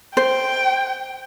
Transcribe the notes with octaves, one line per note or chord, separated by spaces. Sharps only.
C5 G5